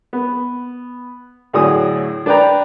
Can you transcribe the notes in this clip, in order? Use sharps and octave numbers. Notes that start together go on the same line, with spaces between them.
B3
D2 A2 F#3 G#4 D#6
D4 B4 D5 G5 A#5